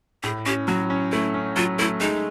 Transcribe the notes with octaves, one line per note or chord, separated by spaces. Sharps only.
A2 G#4
C#4 G4
F#3 F#4
C#4
A3 E4
C#4
F#3 F4
A3 E4
G#3 D#4